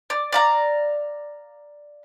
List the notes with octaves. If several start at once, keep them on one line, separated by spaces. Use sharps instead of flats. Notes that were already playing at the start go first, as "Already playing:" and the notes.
D5
D5 F5 A#5